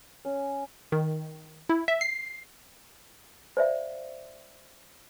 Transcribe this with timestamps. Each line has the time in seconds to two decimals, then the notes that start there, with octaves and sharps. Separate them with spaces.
0.25 C#4
0.92 D#3
1.69 E4
1.88 E5
2.01 C7
3.57 C5 D5 E5 F5